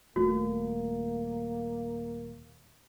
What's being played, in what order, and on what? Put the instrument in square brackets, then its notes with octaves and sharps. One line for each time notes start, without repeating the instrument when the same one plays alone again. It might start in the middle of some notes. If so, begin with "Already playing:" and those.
[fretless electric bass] D#1 A3 [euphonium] A#3 [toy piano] F#4